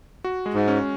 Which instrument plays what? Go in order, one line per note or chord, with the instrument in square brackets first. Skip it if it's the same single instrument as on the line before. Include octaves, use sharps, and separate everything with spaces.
[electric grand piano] F#4
G#3
[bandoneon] G#2
[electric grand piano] C#4